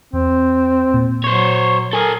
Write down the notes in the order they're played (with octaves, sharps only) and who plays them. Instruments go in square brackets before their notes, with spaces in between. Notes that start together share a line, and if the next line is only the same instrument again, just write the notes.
[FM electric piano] E2 [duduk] C4
[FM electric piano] A#2
[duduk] F#3 [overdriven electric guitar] C5 C#5
[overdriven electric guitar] A4 G#5 [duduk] A#4